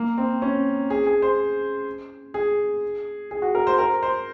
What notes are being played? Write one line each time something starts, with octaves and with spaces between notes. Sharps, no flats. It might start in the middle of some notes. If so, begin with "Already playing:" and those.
Already playing: A#3
C4
C#4
G#4
G#4
C5
G#4
G#4
F#4
A#4
C5
A#4
C5